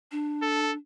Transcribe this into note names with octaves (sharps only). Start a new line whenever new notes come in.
D4
A4